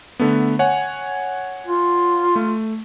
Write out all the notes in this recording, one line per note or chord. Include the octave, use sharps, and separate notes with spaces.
D3 A3 B3
C#5 F#5 G#5
F4
A3